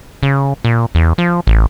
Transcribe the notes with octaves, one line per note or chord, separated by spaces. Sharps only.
C#3
A#2
E2
F3
A1